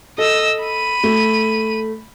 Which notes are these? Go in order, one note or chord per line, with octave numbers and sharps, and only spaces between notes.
A4 D#5 E6
B5 D#7
A3